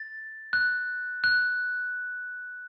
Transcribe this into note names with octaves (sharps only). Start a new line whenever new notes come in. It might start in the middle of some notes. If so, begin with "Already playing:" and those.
Already playing: A6
F#6
F#6